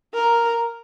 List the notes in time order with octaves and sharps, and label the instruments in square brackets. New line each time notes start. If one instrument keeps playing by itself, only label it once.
[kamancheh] A#4